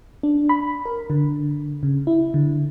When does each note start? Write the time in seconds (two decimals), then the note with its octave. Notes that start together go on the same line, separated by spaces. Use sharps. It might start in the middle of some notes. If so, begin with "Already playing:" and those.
0.23 D4
0.49 B5
0.85 A#4
1.10 D3
1.83 C#3
2.07 E4
2.34 D3